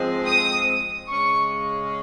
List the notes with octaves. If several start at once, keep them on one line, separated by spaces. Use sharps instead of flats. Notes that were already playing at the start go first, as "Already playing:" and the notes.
Already playing: G#2 F3 G#3 C4
D#6
C#3 G#3 C#4 C#6